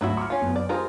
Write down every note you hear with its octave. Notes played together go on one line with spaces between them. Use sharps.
G#1 D2 F#3 E4 F#4 E6
C#6 D6 F6
C#4 F4
F#1 B3
D5
G#3 F4 G4 A#4 C5